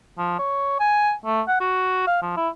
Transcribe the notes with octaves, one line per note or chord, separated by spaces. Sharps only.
F3
C#5
G#5
A3
F#5
F#4
F5
F3
E4